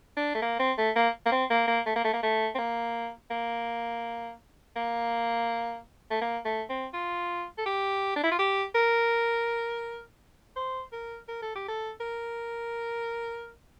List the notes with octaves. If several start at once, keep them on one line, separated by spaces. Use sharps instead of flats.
D4
A3
A#3
C4
A3
A#3
A#3
C4
A#3
A#3
A3
A#3
A3
A#3
A3
C4
A#3
A#3
A#3
A3
A#3
A3
C4
F4
A4
G4
D4
E4
F4
G4
A#4
C5
A#4
A#4
A4
G4
A4
A#4